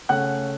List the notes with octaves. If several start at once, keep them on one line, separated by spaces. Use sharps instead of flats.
C#3 A3 C#4 F#5 F#6